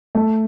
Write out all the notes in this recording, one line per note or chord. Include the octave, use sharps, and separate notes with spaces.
A3